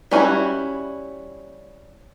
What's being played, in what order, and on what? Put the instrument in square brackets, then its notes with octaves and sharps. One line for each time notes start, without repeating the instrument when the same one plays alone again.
[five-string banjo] G3 C#4 D4 E4 F#4